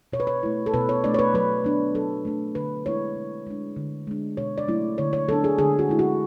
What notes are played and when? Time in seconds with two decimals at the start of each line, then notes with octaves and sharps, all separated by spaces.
0.13 B2 C#5
0.20 B4
0.27 C#5
0.43 A3 E4
0.66 A4
0.73 B2 B4
0.89 C#5
1.04 A3 D4 D5
1.14 C#5
1.19 B4
1.34 F#3 B4
1.64 B3 D4
1.95 F#3 A4
2.25 A3 D4
2.55 D3 B4
2.86 G#3 B3 E4 C#5
3.16 B2
3.47 G#3 D4
3.76 D3
4.07 G#3 D4
4.37 B2 C#5
4.58 D5
4.68 F#3 A3 C#4 E4
4.98 D3 C#5
5.13 C#5
5.28 F#3 B3 D4 A4
5.44 G#4
5.58 D3 G#4
5.79 F#4
5.89 G#3 C#4 E4
5.99 F#4